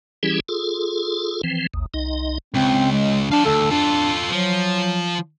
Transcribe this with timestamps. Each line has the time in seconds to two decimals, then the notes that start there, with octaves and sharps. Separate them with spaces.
0.23 E3 G3 C#4 E4 G4 G#4
0.49 F4 G#4 A4
1.44 E3 F3 C4
1.74 A1 D#2
1.94 C2 D#4 D#5
2.54 C#2 C4
2.92 G#3
3.32 D4 F5 A5
3.45 D2 A4
3.71 D4 F4 A4
4.30 F3 F#3